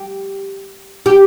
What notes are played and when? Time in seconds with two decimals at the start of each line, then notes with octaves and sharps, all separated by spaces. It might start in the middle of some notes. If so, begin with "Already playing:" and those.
Already playing: G4
1.06 G4